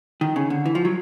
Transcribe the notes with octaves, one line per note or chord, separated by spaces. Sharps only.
D#3
C#3
D3
E3
F3
F#3